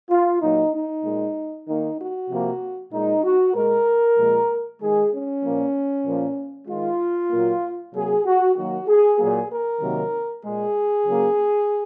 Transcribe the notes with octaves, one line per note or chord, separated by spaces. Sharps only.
F4
A#2 F#3 A#3 D#4
D#4
A#2 G#3
D#3 A#3 D#4
F#4
C3 F3 A#3
A#2 G#3 D#4
F#4
A#2 G#3 A#4
A#2 F3 G#3
D#3 G#3 G#4
C#4
A#2 F3 A#3
A#2 F3 A#3
D#3 G#3 F4
A#2 F#3 A#3
C3 F#3 A#3 G#4
F#4
D#3 F#3 A#3 F#4
G#4
A#2 F#3 A#3 G#4
A#4
C3 D#3 F#3 A#3
A#2 G#3 G#4
C#3 F#3 A#3